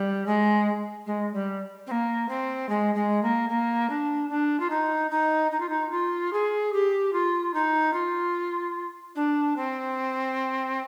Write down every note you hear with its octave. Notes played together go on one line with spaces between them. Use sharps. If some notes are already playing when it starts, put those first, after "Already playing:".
Already playing: G3
G#3
G#3
G3
C4
A#3
C4
G#3
G#3
A#3
A#3
D4
D4
F4
D#4
D#4
D#4
F4
D#4
F4
G#4
G4
F4
D#4
F4
D4
C4